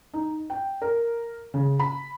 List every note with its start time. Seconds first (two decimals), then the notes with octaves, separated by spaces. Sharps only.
0.14 D#4
0.50 G5
0.82 A#4
1.54 C#3
1.79 B5